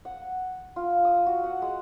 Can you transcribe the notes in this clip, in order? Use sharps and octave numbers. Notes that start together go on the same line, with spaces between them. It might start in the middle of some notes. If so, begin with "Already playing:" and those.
F#5
F4
D#6
F#4
F#5
G#3